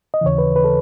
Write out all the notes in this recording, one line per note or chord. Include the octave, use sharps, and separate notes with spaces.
D#5
D#2 C#3 E3 C#5
B4
B4
A4